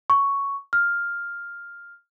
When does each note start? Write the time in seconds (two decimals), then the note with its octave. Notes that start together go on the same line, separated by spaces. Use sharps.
0.10 C#6
0.73 F6